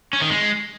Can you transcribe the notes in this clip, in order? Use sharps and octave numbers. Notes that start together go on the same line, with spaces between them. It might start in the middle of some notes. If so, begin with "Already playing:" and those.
C#4
D#3
G#3